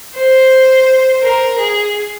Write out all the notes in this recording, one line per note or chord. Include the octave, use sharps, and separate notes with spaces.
C5
A#4
G#4